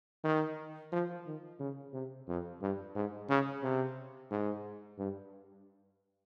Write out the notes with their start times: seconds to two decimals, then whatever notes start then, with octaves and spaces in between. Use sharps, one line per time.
0.24 D#3
0.92 F3
1.26 D#3
1.60 C#3
1.93 C3
2.28 F2
2.61 G2
2.95 G#2
3.29 C#3
3.63 C3
4.31 G#2
4.98 G2